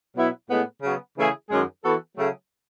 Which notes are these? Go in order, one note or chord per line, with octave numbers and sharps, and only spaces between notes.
B2 F#3 B3 E4
A2 G#3 B3
C#3 F#3 B3
C#3 E3 A3 E4 G#4
F#2 D#3 G#3 C#4 G#4
E3 B3 F#4 A4
C#3 F#3 A3